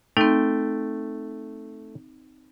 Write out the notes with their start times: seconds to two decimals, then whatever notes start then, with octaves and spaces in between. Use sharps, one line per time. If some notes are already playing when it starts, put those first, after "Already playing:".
0.17 A3 C4 D#4 G5